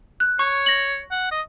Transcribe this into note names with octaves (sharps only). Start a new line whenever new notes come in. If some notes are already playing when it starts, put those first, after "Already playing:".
F#6
C#5 C#6
A#6 F#7
F#5
D#5